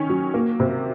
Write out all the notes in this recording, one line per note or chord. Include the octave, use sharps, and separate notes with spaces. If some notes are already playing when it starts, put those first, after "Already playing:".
Already playing: D#3 C#4
F#3
A#3
C3